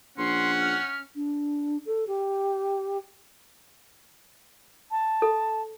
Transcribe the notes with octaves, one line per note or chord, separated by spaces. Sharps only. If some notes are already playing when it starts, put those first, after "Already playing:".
A#1 C#4 F#5 C6
F6
D4
A4
G4
A5
A4